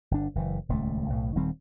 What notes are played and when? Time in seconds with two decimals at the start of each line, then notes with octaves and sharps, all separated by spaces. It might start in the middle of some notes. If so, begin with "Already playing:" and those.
0.11 G1 D4
0.35 F#1 E3
0.69 D#1 C#2 A3
1.10 B1 A2
1.35 D#1 D#3 G3 C4